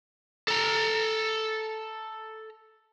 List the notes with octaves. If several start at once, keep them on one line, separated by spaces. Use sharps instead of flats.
A4 A#5